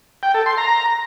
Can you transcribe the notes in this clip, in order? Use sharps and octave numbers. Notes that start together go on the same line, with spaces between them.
G5
A4
C6
A#5